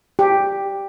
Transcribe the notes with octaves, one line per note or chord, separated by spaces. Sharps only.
G4